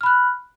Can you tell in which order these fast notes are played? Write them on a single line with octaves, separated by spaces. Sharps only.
F6 B5 F#6